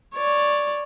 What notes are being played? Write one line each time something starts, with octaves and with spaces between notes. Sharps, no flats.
C#5 D5